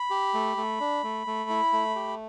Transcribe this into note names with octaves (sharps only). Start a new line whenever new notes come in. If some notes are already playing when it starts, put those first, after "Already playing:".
Already playing: B5
G4
A3
A3
D4
A3
A3
E4
A3
G4